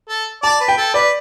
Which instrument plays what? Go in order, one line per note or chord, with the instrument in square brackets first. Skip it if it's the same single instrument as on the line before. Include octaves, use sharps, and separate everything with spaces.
[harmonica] A4
[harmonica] D5 [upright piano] A5
[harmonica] B4
[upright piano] G5
[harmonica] A4
[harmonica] B4 [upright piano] D5